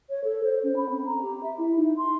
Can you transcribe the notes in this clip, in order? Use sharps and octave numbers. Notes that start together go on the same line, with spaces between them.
C#5
A4
C5
C#4
B5
C4
A#5
G4
E5
E4
D#4
C6